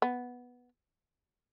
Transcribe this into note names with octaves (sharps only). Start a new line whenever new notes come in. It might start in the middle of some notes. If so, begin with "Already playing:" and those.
B3